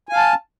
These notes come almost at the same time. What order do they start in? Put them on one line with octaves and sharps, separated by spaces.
G#5 F5 A5